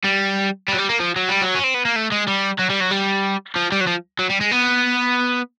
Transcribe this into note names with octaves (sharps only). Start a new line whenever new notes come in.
G3
G3
F#3
G3
A#3
F3
F#3
G3
F#3
C#4
C4
B3
A#3
A3
G#3
G3
F#3
G3
F#3
G3
F3
G3
F#3
F3
F#3
G3
G#3
B3